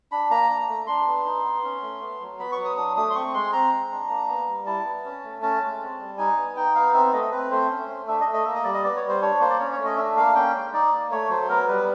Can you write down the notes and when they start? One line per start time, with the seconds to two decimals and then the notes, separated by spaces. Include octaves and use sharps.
0.12 D4 B5
0.31 A#3 A#5
0.50 D4
0.69 A3
0.87 D4 C6
1.07 B3
1.26 D#4
1.44 B3
1.64 C#4
1.82 A3
2.01 B3
2.21 F#3
2.39 B3 B5
2.52 C#6
2.58 F#3
2.65 D#6
2.77 D4 D#6
2.97 A3 D#6
3.10 C6
3.15 C4 C#6
3.34 G#3 C6
3.53 C4 A#5
3.72 G#3
3.91 D4
4.09 A#3
4.28 B3
4.48 G3
4.66 E4 A5
4.85 B3
5.05 C#4
5.24 A3
5.42 C#4 A5
5.62 G#3
5.80 C4
6.00 G3
6.18 D#4 G#5
6.37 B3
6.56 D#4 G5
6.75 B3 F5
6.94 C4 E5
7.13 A3 D#5
7.32 C4 B4
7.51 A3 C5
7.70 C#4
7.89 A3
8.08 D4 E5
8.21 D#5
8.26 A3
8.33 D#5
8.45 A#3 E5
8.55 D#5
8.64 G3 D5
8.74 D#5
8.84 B3 D5
8.96 C#5
9.02 G3
9.09 C5
9.22 D4 C#5
9.41 A#3 C5
9.50 D5
9.59 C#4 C#5
9.72 C#5
9.78 A3
9.85 D#5
9.98 D4 E5
10.17 A#3 F5
10.35 C#4 G5
10.55 G#3
10.73 D#4 D5
10.92 A#3
11.11 A3 C#5
11.30 F#3 C5
11.49 B3 A#4
11.68 G3 B4